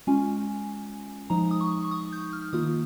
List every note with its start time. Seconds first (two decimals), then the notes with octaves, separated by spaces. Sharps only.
0.07 G#3 C#4 F4 G#5
1.30 F3 G#3 D#4 A#5
1.51 D#6
1.61 C#6
1.85 C#6
1.91 D#6
2.13 G6
2.33 F6
2.53 D#3 A#3 F4 D#6